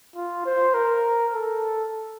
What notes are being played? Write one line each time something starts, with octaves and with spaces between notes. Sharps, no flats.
F4
C5
A#4
A4